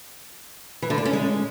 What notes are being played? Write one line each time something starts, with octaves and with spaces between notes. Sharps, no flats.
E3
D3
D4
C#4
G#3